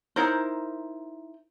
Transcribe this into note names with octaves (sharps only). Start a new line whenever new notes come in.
D#4 E4 A#4 C5